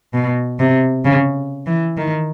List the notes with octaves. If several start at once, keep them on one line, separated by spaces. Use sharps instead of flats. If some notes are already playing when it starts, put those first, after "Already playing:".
B2
C3
C#3
E3
D#3